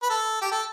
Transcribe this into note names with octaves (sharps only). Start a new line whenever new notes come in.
B4
A4
G4
A4